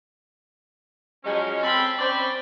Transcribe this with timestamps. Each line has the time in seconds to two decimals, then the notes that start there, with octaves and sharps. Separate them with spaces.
1.24 F3 F#3 G#3 C#4
1.62 C4 A4 B5
1.98 C4 C#4 C5 D5 B5